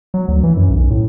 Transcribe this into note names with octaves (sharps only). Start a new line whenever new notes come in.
F#3
D2
E3
F#2
B1
A2